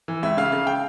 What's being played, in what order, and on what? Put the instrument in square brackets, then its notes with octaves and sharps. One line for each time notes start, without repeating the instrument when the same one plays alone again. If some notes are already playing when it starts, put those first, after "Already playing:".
[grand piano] E3
C#2 E5
C#3 F5
C#3 F5
G5